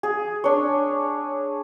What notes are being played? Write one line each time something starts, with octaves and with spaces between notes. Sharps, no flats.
G#4
D4 C#5